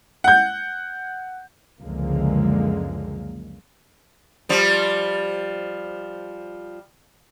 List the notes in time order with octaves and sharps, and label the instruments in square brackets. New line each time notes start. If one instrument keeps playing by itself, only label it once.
[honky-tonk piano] F#5 G6
[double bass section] C#2 F#2 D3 F3 G#3 A#3
[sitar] F3 G3